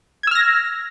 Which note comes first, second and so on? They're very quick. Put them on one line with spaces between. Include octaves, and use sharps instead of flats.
G#6 E6 F6 A#6